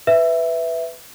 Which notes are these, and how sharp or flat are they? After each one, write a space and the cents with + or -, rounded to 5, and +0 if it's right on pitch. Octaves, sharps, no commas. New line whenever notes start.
B4 +10 E5 +0